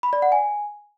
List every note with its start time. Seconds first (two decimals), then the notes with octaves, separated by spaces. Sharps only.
0.03 B5
0.13 D5
0.22 F#5
0.32 G#5